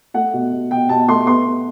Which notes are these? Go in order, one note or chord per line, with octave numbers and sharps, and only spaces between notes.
A3 F#5
B2
B2
B2 G5
B2 A5
A3 C6
B3 C6
B3